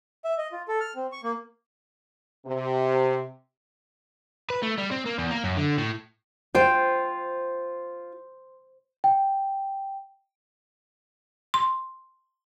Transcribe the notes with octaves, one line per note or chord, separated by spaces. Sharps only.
E5
D#5
F4
A4
F6
C4
C#6
A#3
C3
B4
A3
G3
C4
A#3
E2
A#3
F#2
D3
A2
F4 C5 G5
G5
C6